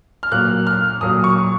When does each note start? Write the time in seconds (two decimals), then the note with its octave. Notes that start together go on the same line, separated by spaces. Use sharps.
0.23 F6
0.32 A#2 F#3 A#3 F#6
0.67 F6
1.01 A#2 F#3 A#3 D#6
1.24 C#6